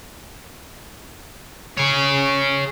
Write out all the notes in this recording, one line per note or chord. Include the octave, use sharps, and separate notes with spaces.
G#4 C#5